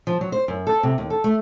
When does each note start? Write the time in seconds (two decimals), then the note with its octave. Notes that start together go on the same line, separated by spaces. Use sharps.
0.07 F3
0.21 F#3
0.32 C5
0.48 F#2
0.67 A4
0.83 C3
0.98 D#2
1.10 A4
1.24 A3